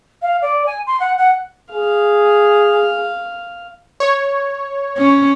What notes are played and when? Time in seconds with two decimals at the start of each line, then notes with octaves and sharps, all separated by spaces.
0.22 F5
0.42 D5
0.66 G#5
0.87 C6
1.00 F#5
1.18 F#5
1.72 G#4 F5
4.00 C#5
4.98 C#4